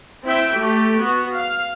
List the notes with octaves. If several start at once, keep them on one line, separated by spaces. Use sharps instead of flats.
C4 E4 E5 G5
A3 G4
B3 F#4
F5